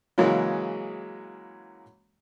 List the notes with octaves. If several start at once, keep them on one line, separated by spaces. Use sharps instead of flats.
C#3 E3 F#3 G#3 A#3 C#4